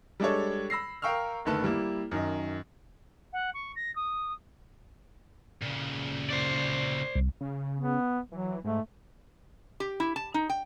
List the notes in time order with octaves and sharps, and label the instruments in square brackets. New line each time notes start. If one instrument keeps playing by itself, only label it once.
[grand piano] G3 G#3 D4 A4 C#5
B5 E6 A#6 C7
A#4 F5 G5 C#6 E6 F6
F#1 D3 D#3 A3 B4 A5
G3 A#3 E4
F#2 D#3 D#5
[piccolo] F#5
C#6
A#6
D#6
[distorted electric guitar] A#2 C#3
[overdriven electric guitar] C5 D5
[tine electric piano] C2
[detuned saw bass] C#3
[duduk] B3
[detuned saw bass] E3 [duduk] F#3
[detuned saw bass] G#2 [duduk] A3
[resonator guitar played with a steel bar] G4
E4
A5
D#4
G5